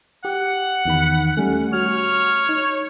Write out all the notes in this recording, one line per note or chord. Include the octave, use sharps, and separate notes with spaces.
G4 F#5
E2 D#3 B5
G3 A3 C#4
F#4 C#5 F6
D#4